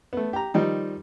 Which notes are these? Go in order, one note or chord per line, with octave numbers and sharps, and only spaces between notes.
A3 B3
G4 A#5
D#3 F3 G3 D#4